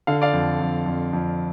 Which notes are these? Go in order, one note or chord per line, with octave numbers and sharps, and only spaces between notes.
D3 F5
D5 F5
F2
F2
F2
F2